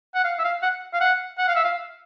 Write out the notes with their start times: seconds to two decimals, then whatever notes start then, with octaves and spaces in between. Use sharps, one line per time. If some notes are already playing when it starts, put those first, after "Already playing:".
0.15 F#5
0.25 F5
0.39 E5
0.44 F5
0.63 F#5
0.94 F5
1.01 F#5
1.38 F#5
1.48 F5
1.56 E5
1.65 F5